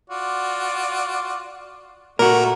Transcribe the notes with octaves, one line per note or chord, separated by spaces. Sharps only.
F4 F#4 D5
A#2 A3 F#4 A#4